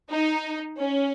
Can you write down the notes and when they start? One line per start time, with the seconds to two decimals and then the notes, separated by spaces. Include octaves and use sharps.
0.11 D#4
0.78 C#4